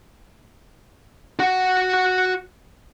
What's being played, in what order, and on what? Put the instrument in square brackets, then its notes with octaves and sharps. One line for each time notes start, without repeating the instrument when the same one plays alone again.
[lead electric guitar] F#4 F#5